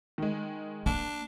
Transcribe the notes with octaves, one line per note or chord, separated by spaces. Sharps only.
D#3 G#3
A#3 D4